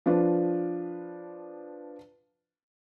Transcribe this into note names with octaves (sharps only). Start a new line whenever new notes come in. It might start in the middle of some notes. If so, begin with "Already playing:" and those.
F3 D4 F4 B4